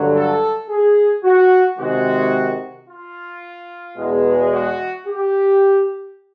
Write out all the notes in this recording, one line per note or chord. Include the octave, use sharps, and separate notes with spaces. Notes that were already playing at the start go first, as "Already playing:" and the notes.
Already playing: G2 D3 F#3
A4
G#4
F#4
C3 D#3 G#3 F#4
F4
E2 B2 G#3
F#4
G4